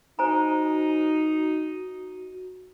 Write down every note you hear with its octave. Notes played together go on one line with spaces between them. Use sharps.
D#4 F#4 C5 G#5 A#5